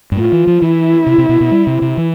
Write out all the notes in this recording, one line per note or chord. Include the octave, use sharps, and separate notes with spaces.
G2
A2 F4
E3
F3
E3 E4
C3
C3
B2
B2
G3
C3
C3
E3